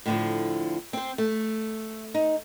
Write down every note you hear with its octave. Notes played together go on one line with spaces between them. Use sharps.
A2 D3 F3
C4 C5
A3
D#4